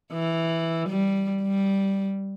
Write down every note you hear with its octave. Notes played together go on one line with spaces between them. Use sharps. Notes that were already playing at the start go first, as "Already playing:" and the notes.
E3
G3
G3